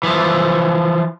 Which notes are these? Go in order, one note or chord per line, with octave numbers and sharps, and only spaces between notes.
E3 F3